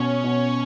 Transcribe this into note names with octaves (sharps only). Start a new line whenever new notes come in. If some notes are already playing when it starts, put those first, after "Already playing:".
Already playing: B2 C#4 C#5
B2